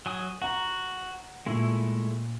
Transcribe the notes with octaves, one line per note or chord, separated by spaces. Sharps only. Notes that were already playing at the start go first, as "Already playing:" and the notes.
F#3 G#5 D#6
F#4 F#5 A#5
A#2 G#3 A3 E4